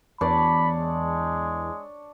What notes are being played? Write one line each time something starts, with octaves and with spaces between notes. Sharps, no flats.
E2 D4 C#5 D5 B5
G#3